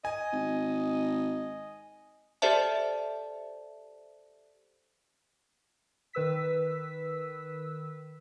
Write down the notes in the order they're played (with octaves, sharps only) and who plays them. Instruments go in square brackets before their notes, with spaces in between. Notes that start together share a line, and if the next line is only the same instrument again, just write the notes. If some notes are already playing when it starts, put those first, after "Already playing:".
[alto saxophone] D#5 [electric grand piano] G#5
[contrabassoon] G#1
[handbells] G4 A4 C5 D5 E5 A5
[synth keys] D#3 B4 E6 B6